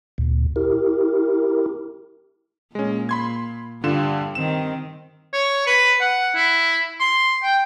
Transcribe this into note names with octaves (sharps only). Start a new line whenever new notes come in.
D2 A#2
E4 G4 A#4
A#2 G#3 C#4
B5 C6 G#6
G2 D3 F4 E7
D#3 C4 E7
C#5
B4
F#5
E4
C6
G5